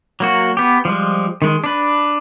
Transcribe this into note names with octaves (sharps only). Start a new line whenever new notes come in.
F#3 A#3 F#4
B3 G4
F3 G3 G#3
D#3 G#3
D4 B4